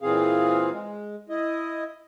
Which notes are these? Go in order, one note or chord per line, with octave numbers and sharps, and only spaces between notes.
A#2 E3 C4 G#4 F5
G#3
E4 D#5